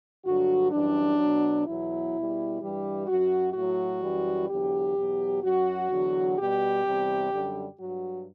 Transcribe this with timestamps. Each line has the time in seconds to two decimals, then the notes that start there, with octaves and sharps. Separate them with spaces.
0.25 G2 D3 F#3 F#4
0.71 F#2 E3 G3 D4
1.19 B2 F#3
1.67 E2 B2 F#3 E4
2.14 B2 G3
2.60 G2 E3 G3 G4
3.07 F#2 F#3 F#4
3.54 A2 F#3 F#4
4.01 F#2 E3 G3
4.48 E2 D3 F#3 G4
4.96 E2 B2 F#3
5.43 F#2 F#3 F#4
5.89 E2 D3 F#3
6.36 B2 G3 G4
6.84 E2 C3 G3
7.32 F#2 D3 G3
7.78 G2 F#3 F#4